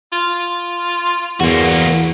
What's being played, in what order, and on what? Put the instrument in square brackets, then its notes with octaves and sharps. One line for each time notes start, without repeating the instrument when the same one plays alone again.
[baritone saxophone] F4
[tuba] E2 [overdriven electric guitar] A#3 F#4